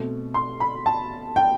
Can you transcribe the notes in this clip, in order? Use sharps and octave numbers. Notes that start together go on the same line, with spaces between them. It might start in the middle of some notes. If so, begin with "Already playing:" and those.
Already playing: B2 A3 C4
C6
B5
A5
G5